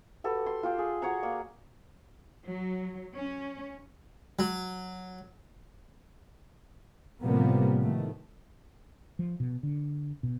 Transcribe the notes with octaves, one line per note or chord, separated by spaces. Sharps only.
F#4 G4 A4 B4
C6
F4 G4 G5
G#4
F#4 C#5 F#5 A#5
A#3 D5
F#3
C#4
F#3
A2 C3 F3 G3 A#3 B3
A2 D#3 A3
F3
B2
D3
B2